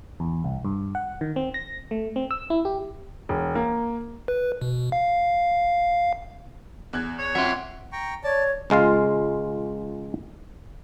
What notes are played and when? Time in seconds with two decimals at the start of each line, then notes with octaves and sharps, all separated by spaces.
0.20 E2
0.44 C2
0.65 G2
0.95 F#5
1.21 D#3
1.36 C4
1.54 A#6
1.91 A3
2.16 C4
2.31 E6
2.50 E4
2.65 G4
3.29 E1
3.55 A#3
4.28 B4
4.61 B2
4.92 F5
6.93 E2 F#6 G#6
7.18 C#5
7.35 F2 C4 E5 F#5 C6
7.92 G5 A#5 C#6
8.24 C#5 D5 A5
8.70 C#2 G#3 F4 F5